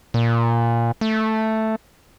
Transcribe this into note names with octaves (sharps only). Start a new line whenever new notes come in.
A#2
A3